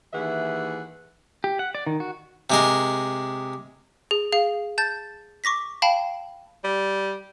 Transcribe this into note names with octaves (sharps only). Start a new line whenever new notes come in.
D#2 E3 G#4 E5 F#5
G4
F#5
D5
D#3
F#4
C3 G#3 A#4
G#4
G#4 F5
A5 G6 A6
C#6 D6 A#6 B6
F5 G5 A5 B5
G3